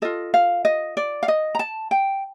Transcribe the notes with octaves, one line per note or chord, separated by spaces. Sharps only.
F4 A4 D#5
F5
D#5
D5
F5
D#5
A#5
A5
G5